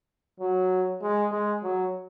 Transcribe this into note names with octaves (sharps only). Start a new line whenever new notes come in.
F#3
G#3
G#3
F#3